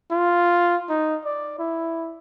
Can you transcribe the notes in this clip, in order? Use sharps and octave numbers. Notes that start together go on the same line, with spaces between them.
F4
D#4
D5
E4